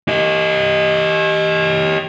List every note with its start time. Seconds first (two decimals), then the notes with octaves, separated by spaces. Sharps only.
0.08 G4 D#5